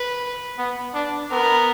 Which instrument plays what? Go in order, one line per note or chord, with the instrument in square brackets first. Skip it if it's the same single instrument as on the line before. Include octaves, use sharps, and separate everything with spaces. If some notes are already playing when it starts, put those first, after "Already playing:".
Already playing: [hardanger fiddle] B4
[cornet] B3
D4
[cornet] B3 [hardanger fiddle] A#4